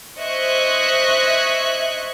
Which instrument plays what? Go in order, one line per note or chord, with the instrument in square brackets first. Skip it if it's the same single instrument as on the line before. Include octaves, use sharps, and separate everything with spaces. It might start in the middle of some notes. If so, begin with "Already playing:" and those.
[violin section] C5 D#5 E5 C#6 F#6 G#6